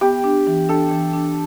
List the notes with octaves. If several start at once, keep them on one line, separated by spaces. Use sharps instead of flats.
B3 G4
D4
E3
D4 A4
E3
D4